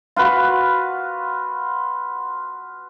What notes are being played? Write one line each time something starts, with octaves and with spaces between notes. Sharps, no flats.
F4 F#4 B4